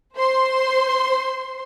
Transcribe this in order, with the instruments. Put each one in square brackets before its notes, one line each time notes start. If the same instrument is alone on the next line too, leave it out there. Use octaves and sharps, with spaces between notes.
[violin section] C5 C6